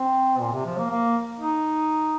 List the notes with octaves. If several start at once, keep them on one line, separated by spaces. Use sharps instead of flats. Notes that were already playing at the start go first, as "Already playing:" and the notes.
Already playing: C4
A#2
C3
F3
A#3
A#3
D#4